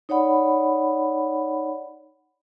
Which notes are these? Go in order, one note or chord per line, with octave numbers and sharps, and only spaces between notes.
D#4 C#5 D5 F#5 B5